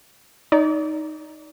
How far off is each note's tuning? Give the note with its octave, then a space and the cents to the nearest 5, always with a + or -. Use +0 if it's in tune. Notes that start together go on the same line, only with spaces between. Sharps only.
D#4 +0 D5 -30